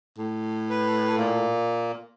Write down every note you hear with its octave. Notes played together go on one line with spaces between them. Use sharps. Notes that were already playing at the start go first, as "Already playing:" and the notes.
A2
B4
A#2 A#3